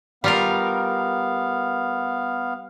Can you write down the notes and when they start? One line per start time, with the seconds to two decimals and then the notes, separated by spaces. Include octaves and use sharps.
0.24 G3 B3 F4 A#4 F5